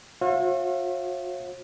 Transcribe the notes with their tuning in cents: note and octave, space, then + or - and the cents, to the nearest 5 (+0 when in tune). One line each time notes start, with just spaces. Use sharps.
F#4 -40 C#5 -45 E5 +45